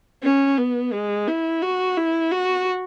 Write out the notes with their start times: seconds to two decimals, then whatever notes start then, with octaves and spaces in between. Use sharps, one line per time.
0.23 C#4
0.58 B3
0.93 G#3
1.28 E4
1.62 F#4
1.97 E4
2.32 F#4